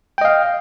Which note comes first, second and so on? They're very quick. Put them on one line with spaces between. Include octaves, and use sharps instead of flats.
G5 D#5 F5